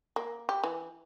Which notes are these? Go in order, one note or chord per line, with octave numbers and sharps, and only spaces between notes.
A#3
G4
E3